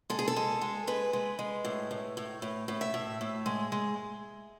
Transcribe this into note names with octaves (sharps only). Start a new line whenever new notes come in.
G#3 A4
G#4
A4
G#3
G#3
G#3 B4
G#3
G#3
A2
A2
A2
A2
A2
E5
A2
A2
G#3
G#3